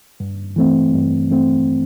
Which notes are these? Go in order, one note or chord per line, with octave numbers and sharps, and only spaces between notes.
G2
E3 A3 C4
G2
E3 A3 C4